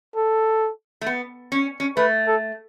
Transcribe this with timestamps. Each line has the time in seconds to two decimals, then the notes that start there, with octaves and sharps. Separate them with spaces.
0.16 A4
1.01 A3
1.06 B3
1.52 C#4
1.80 C#4
1.97 A3 B4
2.27 A4